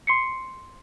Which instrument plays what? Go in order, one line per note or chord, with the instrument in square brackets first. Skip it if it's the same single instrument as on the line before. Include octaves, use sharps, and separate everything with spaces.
[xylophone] C6 C7 C#7